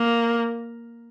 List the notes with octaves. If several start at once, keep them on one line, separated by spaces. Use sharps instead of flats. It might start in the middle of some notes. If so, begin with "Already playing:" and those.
Already playing: A#3